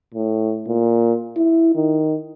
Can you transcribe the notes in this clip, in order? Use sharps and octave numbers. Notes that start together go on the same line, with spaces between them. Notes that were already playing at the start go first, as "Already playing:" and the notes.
A2
A#2
E4
D#3